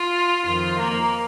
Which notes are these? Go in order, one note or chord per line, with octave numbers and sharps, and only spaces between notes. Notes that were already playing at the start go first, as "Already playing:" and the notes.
Already playing: F4
F2 D#3 F4
A#3